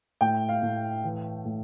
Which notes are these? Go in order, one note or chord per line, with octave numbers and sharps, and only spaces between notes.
A2 G5
F5
A2
E3
A2